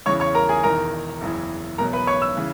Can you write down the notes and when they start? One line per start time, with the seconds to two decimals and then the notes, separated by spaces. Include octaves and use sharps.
0.06 E2 C#3 E3 C#5 C#6
0.20 C#5 C#6
0.34 A#4 A#5
0.49 G#4 G#5
0.63 E1 E2 D#3 A#4 A#5
1.21 F#1 E2 C#3 E3
1.78 E2 B2 F#3 A#4 A#5
1.93 B4 B5
2.07 C#5 C#6
2.22 E6
2.37 C#3 E3